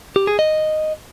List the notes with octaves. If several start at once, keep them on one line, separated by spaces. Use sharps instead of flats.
G4
G#4
D#5